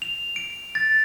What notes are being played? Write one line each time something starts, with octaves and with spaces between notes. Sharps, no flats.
F7
D7
A6